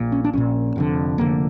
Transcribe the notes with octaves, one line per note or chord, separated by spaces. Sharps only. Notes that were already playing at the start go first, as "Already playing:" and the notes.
Already playing: A#1 A#2
C#4
D4
A#1 A#2 C#4
F1 F2 D3
F1 F2 D3 A#3